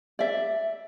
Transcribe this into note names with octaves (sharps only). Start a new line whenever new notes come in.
D5 E5